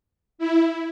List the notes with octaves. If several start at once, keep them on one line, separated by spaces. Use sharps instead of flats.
E4